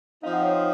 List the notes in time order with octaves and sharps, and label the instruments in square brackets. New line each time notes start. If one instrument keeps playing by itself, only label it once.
[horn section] F3 C4 D#4 [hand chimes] F5
[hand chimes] F#5
C#5 F5